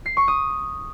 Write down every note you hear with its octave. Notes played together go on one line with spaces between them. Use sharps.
C7
C#6
D#6